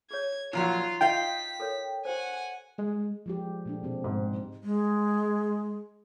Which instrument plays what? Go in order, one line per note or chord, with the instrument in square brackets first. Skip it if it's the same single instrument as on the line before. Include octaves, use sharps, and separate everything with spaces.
[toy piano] G#4 C#5 [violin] G#6
[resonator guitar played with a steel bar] A#2 F3 F#3 [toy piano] D#4 A#5 C#6 [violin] F4 F5
[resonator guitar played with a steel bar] F4 D#5 F5 [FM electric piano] G5 [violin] B6
[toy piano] A4 A#4 C#5
[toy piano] G4 C5 [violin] F#5 G#5
[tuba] G#3
[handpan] F3 G#3 G4
A#2 A3 D4
B2 C4 G4
[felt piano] G#2
[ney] G#3